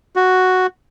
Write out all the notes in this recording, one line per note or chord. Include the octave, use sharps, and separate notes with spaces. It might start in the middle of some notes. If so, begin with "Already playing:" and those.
F#4